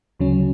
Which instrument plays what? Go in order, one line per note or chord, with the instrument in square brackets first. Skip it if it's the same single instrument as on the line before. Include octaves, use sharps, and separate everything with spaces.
[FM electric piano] D2 C#3 F#3 C#4